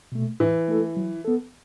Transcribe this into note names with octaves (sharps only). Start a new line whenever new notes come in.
B2 A3
A2 E3
A3 E4 A4
F#3
B3 A4